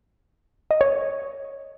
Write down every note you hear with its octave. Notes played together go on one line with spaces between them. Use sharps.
D#5
C#5